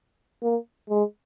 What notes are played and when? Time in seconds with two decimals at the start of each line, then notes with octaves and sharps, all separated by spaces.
0.42 A#3
0.89 G#3